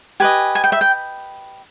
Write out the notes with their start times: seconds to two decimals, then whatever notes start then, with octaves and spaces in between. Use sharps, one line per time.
0.20 G4 B4 D#5 G#5
0.55 G#5
0.64 G5
0.72 E5
0.81 G5